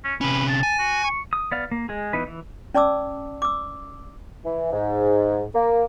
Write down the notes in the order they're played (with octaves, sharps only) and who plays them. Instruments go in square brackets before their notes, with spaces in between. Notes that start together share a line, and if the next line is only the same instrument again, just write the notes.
[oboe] C#4
[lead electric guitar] C3 C#4 [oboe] B4
[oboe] A5
[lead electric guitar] G#5
[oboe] F#4
C#6
[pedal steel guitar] D#6
B3 D5 F5
A#3
G#3 G#4
E3 B3 D#4 B4
E3
[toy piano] C#4 D5 A5 D6 E6
D6 E6
[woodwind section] E3
G#2
A#3